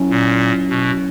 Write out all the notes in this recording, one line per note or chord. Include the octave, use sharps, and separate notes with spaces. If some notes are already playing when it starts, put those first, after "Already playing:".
Already playing: F#3 C#4 E4
A#2
B2